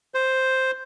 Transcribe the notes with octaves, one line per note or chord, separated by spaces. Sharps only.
C5